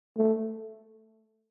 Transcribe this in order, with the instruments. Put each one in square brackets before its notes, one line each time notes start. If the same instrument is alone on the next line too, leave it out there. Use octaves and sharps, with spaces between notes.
[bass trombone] A3